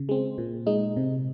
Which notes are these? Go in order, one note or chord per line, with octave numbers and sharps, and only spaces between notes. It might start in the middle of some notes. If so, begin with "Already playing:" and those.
Already playing: C#3
G#3 C4
A#2
G#3 D#4
C3